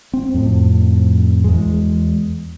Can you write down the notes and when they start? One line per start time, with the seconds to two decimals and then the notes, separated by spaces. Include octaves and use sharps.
0.13 C4
0.34 F2 A2
1.44 E2 G#3